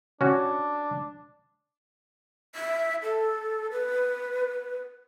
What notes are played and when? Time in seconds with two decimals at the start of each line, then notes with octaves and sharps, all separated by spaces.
0.21 C#4 D4 F#4
2.55 E5
3.03 A4
3.71 B4